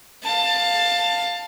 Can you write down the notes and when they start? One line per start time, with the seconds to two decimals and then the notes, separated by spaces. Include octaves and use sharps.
0.23 F5 A5